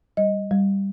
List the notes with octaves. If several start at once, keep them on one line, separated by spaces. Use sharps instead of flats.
G3 D#5
G3